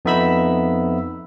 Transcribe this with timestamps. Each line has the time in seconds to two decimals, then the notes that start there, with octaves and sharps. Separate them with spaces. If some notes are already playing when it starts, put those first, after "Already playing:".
0.05 F2 B3 D#4 E5 B5 E6